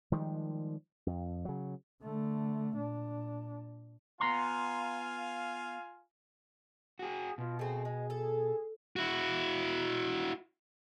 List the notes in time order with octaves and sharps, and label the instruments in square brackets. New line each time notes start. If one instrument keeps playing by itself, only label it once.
[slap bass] D#3 F3 G3 G#3
F2
C#3 F#3
[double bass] D3 A3
A#2 D4
[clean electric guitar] B3 A#5 C6 [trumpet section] F4 F5 G#5
[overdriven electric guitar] F#4 G#4
[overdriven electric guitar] B2 [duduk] F4
[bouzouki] A3 C4 [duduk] G#4
[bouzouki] G#3
A4
[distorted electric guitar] E4 F#4